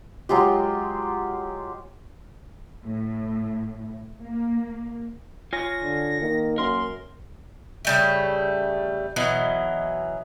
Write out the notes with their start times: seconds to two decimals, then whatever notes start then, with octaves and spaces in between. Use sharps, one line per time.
0.29 F#3 G#3 F4 G4
2.87 A2
4.25 A#3
5.53 F4 C#5 G#5 A#6
5.83 D3
6.21 D#3 A#3
6.58 F#2 A#4 C6
7.85 C#3 G3 A3
9.16 B2 E3 F#3